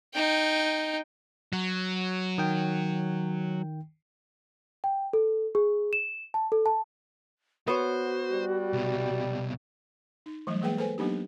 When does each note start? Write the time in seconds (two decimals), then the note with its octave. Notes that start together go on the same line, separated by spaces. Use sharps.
0.13 D#4 G5
1.53 F#3
2.38 D#3 G5
4.84 G5
5.13 A4
5.55 G#4
5.93 E7
6.34 A5
6.52 A4
6.66 A5
7.68 B3 F#4 C5 C#5
8.32 G3
8.73 C2 B2
10.26 D#4
10.47 E3 F#3 G3 A3
10.62 E3 G#3 A#3 G#4 B4 G5
10.78 A4 B4 C5 G#5
10.98 F#3 A#3 B3 D4 D#4 G4